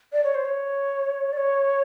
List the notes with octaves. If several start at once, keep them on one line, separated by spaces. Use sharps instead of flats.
D5
C#5
C5
C#5
D5
C#5